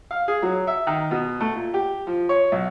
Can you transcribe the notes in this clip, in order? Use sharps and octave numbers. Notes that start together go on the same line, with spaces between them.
F5
G#4
F#3
E5
D#3
B2
A3
A#2
G4
F3
C#5
B1